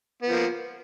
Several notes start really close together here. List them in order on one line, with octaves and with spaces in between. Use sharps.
B3 F3 A#3